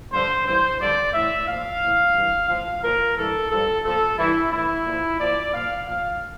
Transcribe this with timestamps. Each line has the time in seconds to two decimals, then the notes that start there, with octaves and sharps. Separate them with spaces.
0.13 G2 D3 F3 C5
0.46 G2 E3 C5
0.80 G2 D3 F3 D5
1.14 A2 E3 E5
1.47 A#2 F3 F5
1.81 A2 E3
2.15 G2 E3
2.49 A2 F3 F5
2.83 A#2 F3 A#4
3.17 G2 E3 A4
3.50 G2 F3 A4
3.84 A#2 F3 A4
4.18 G2 E3 E4
4.52 A2 E3 E4
4.86 A#2 F3
5.20 A#2 F3 D5
5.54 A#2 F3 F5
5.87 A#2 F3 F5